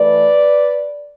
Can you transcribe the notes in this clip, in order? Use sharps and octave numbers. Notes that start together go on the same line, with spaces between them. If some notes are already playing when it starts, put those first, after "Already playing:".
Already playing: E3 A3 B4 D5